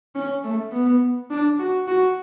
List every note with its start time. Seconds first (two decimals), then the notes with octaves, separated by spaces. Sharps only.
0.15 C#4
0.44 A3
0.72 B3
1.31 D4
1.59 F#4
1.88 F#4